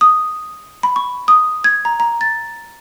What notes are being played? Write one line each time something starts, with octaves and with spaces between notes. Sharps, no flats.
D#6
B5
C#6
D#6
G#6
A#5
A#5
A6